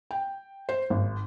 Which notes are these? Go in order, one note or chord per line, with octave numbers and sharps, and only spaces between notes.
G5
C5
G#1